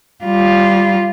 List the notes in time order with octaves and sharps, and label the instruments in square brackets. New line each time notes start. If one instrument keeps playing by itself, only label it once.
[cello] G3 F4